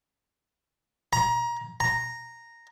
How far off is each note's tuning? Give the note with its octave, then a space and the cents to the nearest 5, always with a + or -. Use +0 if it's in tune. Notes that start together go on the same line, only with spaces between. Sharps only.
A#5 +25
A#5 -5